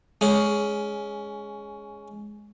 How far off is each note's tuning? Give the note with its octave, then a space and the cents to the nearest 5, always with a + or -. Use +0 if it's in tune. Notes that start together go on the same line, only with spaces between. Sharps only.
G#3 +0 C#4 +10